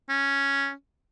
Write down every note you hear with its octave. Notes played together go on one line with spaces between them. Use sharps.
C#4